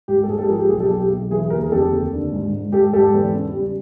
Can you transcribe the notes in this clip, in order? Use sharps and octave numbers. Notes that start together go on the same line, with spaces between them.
G#2 G4
A4
G#2 G#4
G4 A4
F3 G#4 A#4
G4
B1 G#4
G4 A4
B1 G#4
G4
B1
E3 G#4
D#2 G#4 A#4
G#4
F1 G4 A4
D#2
D3
G#2
G#2
G#2 G4 A4
G#2 G4 A4
E2
C#3
G3